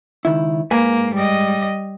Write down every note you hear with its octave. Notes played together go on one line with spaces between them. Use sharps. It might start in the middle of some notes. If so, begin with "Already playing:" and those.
C#2 D#3 E4
G#2 A#3 B4 G#5
G3 D#5